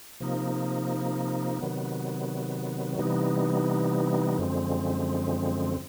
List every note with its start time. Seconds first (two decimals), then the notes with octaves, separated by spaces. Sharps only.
0.20 C3 F3 A#3 D#4
1.59 C3 D#3 F#3 B3
2.99 C3 E3 G3 B3 D#4
4.38 F#2 D3 F3 G#3 C4